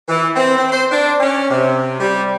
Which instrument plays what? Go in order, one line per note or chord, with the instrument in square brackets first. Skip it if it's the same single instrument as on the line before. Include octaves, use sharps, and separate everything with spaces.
[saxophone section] E3
C4
C4
C5
D4
C#4
C3
G3